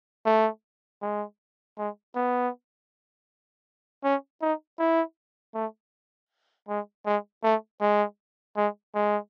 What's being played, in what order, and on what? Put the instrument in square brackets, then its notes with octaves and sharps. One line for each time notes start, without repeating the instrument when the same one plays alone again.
[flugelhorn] A3
G#3
G#3
B3
C#4
D#4
E4
A3
G#3
G#3
A3
G#3
G#3
G#3